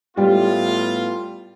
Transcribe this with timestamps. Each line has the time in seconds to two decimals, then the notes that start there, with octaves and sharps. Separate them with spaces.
0.17 A2 G3 B3 F4